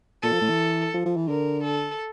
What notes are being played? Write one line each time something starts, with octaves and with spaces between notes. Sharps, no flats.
A#2 A4
F3
A2
E3
F3
F3
E3
D3 A#4
A4